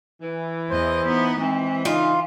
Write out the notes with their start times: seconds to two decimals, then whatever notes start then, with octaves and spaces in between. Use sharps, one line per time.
0.22 E3
0.70 E2 C5 D#5
1.05 B3 D#4
1.40 E3 G#3 C4
1.85 C#3 D4 D#4 F4